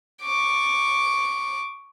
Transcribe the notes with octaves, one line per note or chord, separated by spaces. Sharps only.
C#6 D6